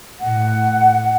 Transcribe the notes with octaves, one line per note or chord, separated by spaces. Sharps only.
A2 F#5